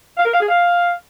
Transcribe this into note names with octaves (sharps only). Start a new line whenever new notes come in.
F5
A#4
F5
G#4
F5